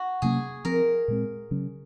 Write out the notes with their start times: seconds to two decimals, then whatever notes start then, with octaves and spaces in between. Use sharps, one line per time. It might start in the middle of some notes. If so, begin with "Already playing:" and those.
Already playing: F#4
0.22 C3 F#3 A#3 C#4 G#4
0.65 F3 C4 A#4
1.08 A#2 G#3 C4
1.51 C#3 F#3 C#4